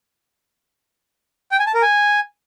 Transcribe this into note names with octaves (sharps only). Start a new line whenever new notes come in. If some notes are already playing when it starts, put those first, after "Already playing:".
G5
G#5
A5
A#4
G#5